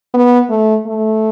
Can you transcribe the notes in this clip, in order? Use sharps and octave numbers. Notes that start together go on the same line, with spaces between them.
B3
A3
A3